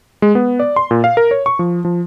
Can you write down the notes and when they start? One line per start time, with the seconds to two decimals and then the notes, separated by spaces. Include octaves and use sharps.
0.22 G#3
0.35 B3
0.60 D5
0.76 C6
0.91 A#2
1.04 F5
1.17 A#4
1.31 C#5
1.46 C#6
1.59 F3
1.85 F3